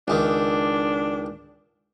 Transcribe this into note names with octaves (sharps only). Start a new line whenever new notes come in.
C#2 D#3 D4